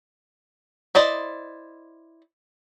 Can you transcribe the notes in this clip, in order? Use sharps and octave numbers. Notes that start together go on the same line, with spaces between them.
E4 C5 D5 D#5